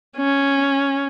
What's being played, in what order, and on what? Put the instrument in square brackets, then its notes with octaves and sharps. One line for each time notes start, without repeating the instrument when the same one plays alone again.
[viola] C#4